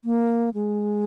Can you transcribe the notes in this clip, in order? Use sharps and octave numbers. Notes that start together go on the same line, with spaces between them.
A#3
G#3